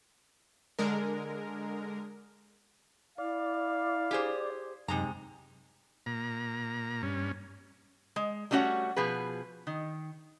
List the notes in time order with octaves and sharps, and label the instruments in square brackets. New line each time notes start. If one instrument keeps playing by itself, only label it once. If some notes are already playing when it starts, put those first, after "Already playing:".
[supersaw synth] D3 G#3 A#4
[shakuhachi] E4 [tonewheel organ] D5 [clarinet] F5
[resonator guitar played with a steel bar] G4 G#4 C5
[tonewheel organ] F#2 [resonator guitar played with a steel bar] C3 G#3 A#5 [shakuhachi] D#4
[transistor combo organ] A#2 A#5
G2 C#4
[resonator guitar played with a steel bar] G#3
G3 A3 C#4 F#4 C#5 F#5
B2 F3 G#4 B4
D#3